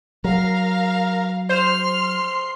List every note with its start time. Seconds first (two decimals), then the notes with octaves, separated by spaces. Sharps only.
0.24 F#3 A#4 F5
1.49 C5 C6 F6